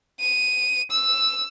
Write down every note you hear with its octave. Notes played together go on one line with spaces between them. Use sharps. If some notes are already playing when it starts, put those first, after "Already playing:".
D#7
E6